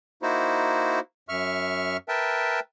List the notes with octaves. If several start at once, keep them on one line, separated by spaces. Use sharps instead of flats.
A#3 D#4 E4 F#4 C5
F#2 E5 C#6 F6
A#4 B4 E5 G5 A5